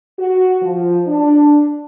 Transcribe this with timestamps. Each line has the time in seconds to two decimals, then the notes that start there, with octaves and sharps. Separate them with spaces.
0.19 F#4
0.62 F3
1.07 D4